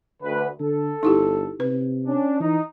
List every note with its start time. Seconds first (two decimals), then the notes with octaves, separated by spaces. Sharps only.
0.23 D2 B4
0.60 D3 A4
1.03 G1 D#4 E4 G4
1.60 C3 B4
2.06 C#4 D4
2.40 E3 D#4